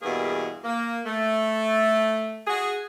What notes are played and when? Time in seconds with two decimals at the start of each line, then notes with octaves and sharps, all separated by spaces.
0.02 E2 G2 B2 A#3 G#4
0.64 A#3
1.05 A3
2.47 F#4 G#4